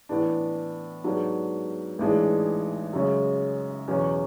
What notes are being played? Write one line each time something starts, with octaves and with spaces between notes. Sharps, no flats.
A2 E3 B3 D4
G#2 F#3 B3 D4
A1 G#2 E3 G#3 D4
F#2 C#3 G#3 C#4
E2 B2 F#3 C#4